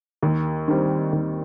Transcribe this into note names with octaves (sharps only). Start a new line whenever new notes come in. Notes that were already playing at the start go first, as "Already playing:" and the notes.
D#2
D#3 G3 C4
D#2